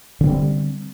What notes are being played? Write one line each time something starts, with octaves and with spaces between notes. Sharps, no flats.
D3 G3 B3 C4